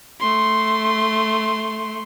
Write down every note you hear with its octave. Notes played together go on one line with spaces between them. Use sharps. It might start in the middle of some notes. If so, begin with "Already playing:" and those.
A3 C6